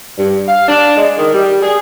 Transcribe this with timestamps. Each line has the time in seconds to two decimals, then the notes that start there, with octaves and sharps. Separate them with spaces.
0.18 G2
0.48 F5
0.69 D4
0.97 G#3
1.18 D#3
1.34 G3
1.63 G#4